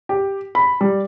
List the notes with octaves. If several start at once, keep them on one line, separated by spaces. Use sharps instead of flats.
G4
B5
G3